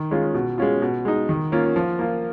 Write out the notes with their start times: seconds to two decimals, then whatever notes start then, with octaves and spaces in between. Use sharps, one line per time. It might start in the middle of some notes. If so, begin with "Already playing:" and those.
Already playing: D#3
0.11 G#3 C#4 F4
0.34 B2
0.58 G#3 C#4 F4
0.82 B2
1.05 G#3 D#4
1.29 D#3
1.52 A#3 C#4 F4
1.76 F3
1.99 A#3 F4